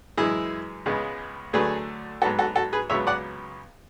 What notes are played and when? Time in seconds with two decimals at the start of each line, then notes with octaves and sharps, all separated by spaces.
0.17 F#2 E3 G#3 E4 G#4
0.86 C#2 C#3 G#3 B3
1.53 D2 D3 F#3 A3 G#4 B4
2.22 G#2 F#3 B3 F#4 A4
2.39 F#4 A4
2.56 F#4 A4
2.73 G#4 B4
2.90 C#2 C#3 F#3 B3 C#5 E5
3.07 D5 F#5